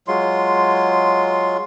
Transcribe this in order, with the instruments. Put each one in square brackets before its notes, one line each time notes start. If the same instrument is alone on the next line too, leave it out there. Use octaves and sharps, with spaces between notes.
[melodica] F#3 G#3 F4 C6